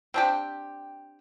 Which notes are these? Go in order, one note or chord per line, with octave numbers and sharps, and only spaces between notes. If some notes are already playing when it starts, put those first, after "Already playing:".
C4 D4 G4